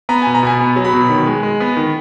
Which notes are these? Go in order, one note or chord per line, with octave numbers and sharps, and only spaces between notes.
B3 A#5
G#5
B2
A#5
B2 G#5
B3
F#3
B5
B2
D#3
G#3
G#3
B3
D#3